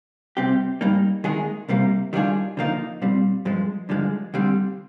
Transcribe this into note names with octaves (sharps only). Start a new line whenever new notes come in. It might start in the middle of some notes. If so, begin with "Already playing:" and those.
C3 G3 C4 G4
G#2 G3 A#3 D#4
D#2 D#3 G#3 D#4 G#4
C2 C3 G3 A#3
D#3 G3 D4 F4 G#4
D3 F3 A#3 D#4
A#2 G3 C4
G2 F3 G#3
G2 D3 F3 G#3
D#2 D3 G3 C4